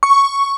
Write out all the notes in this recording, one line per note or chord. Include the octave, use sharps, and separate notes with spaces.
C#6